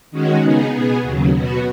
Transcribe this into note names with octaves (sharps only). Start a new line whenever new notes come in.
D#3 G#3 C#4 F#4
C#3 B3 D#4 G#4
B2 B3 G#4
D#2 C#3 F#3
B2 B3 F#4